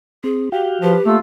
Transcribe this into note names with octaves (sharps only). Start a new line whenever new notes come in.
C4 G#4
F#4 G4 F5 G5
F3 G4 B4
A3 A#3 F4 E6